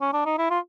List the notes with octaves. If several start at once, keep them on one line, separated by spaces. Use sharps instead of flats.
C#4
D4
D#4
E4
F4